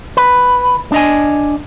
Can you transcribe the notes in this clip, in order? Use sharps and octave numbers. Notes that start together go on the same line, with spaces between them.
B4
D4 D#5 G#5